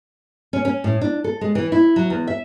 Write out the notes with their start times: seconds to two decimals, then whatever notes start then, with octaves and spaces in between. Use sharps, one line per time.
0.53 C#4
0.65 C#4
0.84 A2
1.01 D4
1.24 A4
1.41 G#3
1.55 E3
1.72 E4
1.96 F#3
2.10 E2
2.27 E5